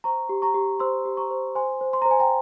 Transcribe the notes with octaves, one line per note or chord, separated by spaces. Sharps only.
C5 A#5 C#6
G4
A#5 C#6
G4
C5 C6 E6
G4
A#5 C#6
C5
C5 G#5 C6
C5
C6
C5 A#5
G#5
G5 A#5